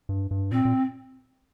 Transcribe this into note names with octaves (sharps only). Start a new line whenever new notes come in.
G2
G2
A#2 C4
A#2